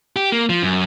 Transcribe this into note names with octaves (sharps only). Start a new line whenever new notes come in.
G4
A#3
F3
F#2